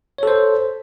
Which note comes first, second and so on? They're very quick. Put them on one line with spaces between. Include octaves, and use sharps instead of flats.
C#5 A4 C5